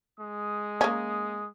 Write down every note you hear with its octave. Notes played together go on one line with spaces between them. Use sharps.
G#3 D#6
A#3 C#4